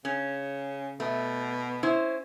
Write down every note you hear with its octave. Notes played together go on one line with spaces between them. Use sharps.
C#3 C#4
B2 A3
C#4 E4 C5